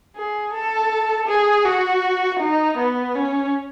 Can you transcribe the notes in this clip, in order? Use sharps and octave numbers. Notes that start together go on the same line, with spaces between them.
G#4
A4
G#4
F#4
D#4
B3
C#4